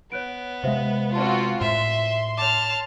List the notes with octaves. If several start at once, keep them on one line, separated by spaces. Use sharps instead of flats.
B3 C#5 F#6 D7
C3 G#3 C5 E5 F5
C4 F4 F#4 C5 D5 A5
A2 E5 C6
C#5 A5 D6 F6